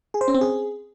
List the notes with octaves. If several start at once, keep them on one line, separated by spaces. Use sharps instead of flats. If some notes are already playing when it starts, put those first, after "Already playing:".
G#4
C5
C#4
C4
G#4